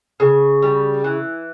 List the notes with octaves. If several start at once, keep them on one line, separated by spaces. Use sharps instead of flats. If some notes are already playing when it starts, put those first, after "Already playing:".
C#3
G3
E3